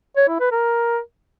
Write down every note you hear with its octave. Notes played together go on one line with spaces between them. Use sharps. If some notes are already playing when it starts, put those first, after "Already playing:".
C#5
E4
B4
A#4